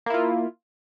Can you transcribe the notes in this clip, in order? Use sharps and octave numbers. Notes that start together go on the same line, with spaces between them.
A#3 E4 F4